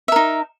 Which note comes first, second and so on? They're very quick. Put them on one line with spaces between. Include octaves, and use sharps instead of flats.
E5 A#4 D#4